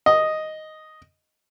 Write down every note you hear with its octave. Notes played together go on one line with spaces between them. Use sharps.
D#5